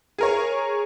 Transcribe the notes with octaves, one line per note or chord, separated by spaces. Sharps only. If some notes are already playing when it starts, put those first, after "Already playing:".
G#4 A#4 C#5